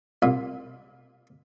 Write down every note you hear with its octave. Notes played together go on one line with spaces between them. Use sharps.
C2 A#2